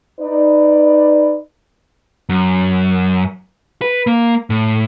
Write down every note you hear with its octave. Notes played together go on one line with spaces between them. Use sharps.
D#4 B4 D5
F#2
B4
A#3
A2